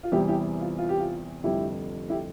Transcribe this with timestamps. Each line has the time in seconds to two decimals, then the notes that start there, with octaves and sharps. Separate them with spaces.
0.03 F4
0.12 E2 C3 E3 G3 E4 G4
0.28 E4 G4
0.61 F4
0.78 F4
0.89 G4
0.99 F4
1.43 F1 F2 D3 G3 E4 G4
2.10 E4 G4